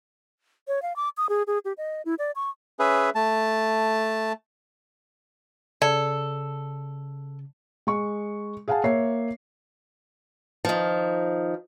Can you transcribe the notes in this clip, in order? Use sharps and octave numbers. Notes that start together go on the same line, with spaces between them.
C#5
F5
D6
D#6
G#4
G#4
G4
D#5
E4
D5
C#6
C#4 G#4 B4 E5
A3 A5
C#3 A4 D5
G#3 C#6
G#4 F5 F#5 G#5 A5
A#3 C#5 E5 C7
D#3 F3